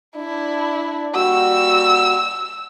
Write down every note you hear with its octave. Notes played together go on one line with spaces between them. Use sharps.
D4 E4
G3 A#3 F#4 E6